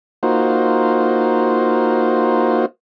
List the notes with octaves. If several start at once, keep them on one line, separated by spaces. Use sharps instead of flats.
A#3 D#4 F4 F#4 C5